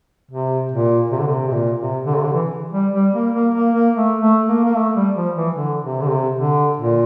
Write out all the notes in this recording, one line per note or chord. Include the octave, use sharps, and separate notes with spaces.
C3
A#2
C3
D3
C3
C3
A#2
C3
D3
C3
D3
E3
G3
G3
A#3
A#3
A#3
A#3
A3
A3
A#3
A#3
A3
G3
F3
E3
D3
C3
D3
C3
D3
A#2